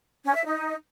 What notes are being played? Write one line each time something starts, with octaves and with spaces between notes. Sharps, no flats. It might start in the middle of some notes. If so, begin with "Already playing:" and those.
C#4
E5
D#4